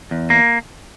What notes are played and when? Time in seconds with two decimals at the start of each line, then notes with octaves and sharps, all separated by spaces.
0.11 E2
0.30 A#3